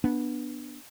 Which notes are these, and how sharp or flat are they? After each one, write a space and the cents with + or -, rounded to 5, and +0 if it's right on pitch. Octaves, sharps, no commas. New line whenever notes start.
B3 -10 D4 +10